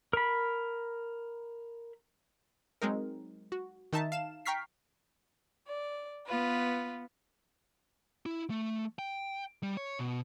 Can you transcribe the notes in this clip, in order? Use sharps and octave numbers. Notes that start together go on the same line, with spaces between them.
A#4 B5
F#3 G#3 C4 D#4 A#4
F#4
D#3 D#4 E5 A5
F5 E7
G5 A#5 C#6 F6 B6 C7
D5
B3 F4 B4
E4
A3
G5
G3
C#5
B2